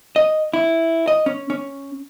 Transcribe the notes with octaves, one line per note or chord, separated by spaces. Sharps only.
D#5
E4
D#5
C#4
C#4